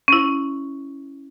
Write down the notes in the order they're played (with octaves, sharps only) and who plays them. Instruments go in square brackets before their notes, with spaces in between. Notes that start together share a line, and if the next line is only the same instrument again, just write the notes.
[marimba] C#4 E4